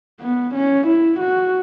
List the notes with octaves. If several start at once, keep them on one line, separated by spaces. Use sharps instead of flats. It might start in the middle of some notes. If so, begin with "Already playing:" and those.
B3
C#4
E4
F#4